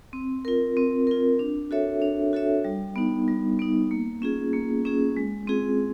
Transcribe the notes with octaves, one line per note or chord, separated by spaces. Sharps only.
C4
F4 A#4
C4
F4 A#4
D4
F#4 A4 C#5 E5
D4
F#4 A4 C#5 E5
G3
B3 D#4
G3
B3 D#4
A#3
C#4 F4 G#4
A#3
C#4 F4 G#4
G#3
C4 F4 G#4